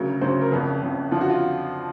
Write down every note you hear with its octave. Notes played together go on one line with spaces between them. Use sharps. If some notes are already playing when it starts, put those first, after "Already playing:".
Already playing: D2 C#3 F#3 A#4
D2 C#3 F#3 C5
A#4
F#1 F2 C#3 B4
F#1 F2 C#3
F2 D3 F3 F4
F#4
F4